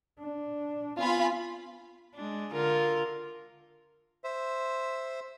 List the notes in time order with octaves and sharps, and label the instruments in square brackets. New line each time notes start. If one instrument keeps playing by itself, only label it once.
[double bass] D4
[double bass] B3 C4 [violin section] F4 G#5 B5
[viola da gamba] G#3 D4
D3 F4 A#4
[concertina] C5 E5